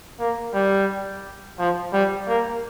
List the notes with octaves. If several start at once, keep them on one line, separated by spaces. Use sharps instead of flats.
A#3
G3
F3
G3
A#3